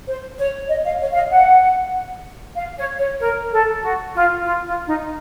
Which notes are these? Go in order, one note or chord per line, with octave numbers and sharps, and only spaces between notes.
C5
C#5
D#5
F5
C#5
F5
D#5
F#5
F5
C#5
C#5
A#4
A4
F#4
F4
F4
F4
D#4